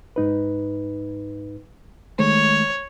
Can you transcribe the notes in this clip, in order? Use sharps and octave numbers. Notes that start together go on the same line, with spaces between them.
G#2 D#4 B4
D#3 G#3 A3 C#5